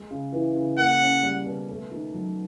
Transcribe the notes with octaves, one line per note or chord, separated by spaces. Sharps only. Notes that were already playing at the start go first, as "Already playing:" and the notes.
Already playing: G#3
C#3
E3
C#3
A#3 F#5
C#4
G3
B2
A3
D#3
F#3